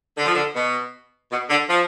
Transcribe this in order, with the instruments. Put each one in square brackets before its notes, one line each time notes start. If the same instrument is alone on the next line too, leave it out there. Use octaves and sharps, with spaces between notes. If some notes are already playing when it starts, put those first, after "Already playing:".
[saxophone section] D3
F3
D3
B2
B2
D3
F3